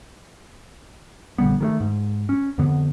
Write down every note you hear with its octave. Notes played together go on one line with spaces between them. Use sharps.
A#1 D3 G3 B3
D#3 G3 A3
G#2
C#4
F2 D3 B3